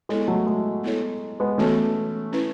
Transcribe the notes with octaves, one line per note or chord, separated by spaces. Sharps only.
G#3 B3 E4 A4 C#5
F#3 A3
G#3
B3 E4 A4 C#5
G#3 B3
E3 A3 B3 C#4 F#4 A4
C#4 E4 B4